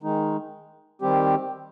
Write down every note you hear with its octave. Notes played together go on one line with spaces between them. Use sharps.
D#3 G#3 D#4
D#3 G3 C4 G4